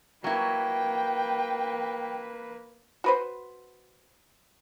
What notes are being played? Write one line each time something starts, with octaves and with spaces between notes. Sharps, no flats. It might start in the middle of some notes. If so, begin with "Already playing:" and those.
F#3 A#3 E4 B4 G5
F#4 B4 C5